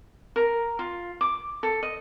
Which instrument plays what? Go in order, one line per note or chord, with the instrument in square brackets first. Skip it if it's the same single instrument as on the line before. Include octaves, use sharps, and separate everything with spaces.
[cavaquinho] A#4
F4
D6
A4
D#5